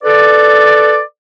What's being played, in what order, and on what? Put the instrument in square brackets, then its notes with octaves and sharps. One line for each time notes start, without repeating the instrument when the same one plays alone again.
[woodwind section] A4 B4 D5